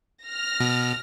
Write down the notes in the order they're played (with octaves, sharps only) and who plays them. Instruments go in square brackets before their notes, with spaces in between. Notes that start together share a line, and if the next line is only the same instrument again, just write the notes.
[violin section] F6 A#6
[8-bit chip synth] B2